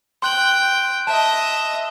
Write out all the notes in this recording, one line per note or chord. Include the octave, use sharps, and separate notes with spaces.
G5 C6 F#6 F#7
D#5 E5 A5